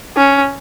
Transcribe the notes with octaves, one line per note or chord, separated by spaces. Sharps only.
C#4